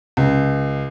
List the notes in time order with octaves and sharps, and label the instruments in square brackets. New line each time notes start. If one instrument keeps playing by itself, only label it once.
[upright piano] C#2